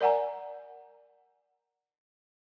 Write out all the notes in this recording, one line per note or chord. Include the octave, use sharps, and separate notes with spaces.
A#4 D5 F#5 G#5 A#5